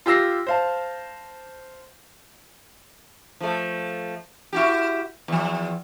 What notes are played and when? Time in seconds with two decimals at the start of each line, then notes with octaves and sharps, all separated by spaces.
0.06 F4 G4 E6 A#6 C7
0.47 C5 F5 A5
3.41 F3 A3
4.53 E4 F#4 G4
5.28 E2 F3